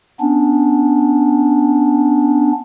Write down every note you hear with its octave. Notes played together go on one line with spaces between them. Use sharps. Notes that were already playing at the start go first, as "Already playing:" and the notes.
B3 C#4 D4